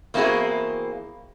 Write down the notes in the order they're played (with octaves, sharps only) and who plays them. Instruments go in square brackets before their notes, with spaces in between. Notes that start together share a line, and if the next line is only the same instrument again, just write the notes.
[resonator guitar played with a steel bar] E2 A#3 C4 E4 F#4 G#4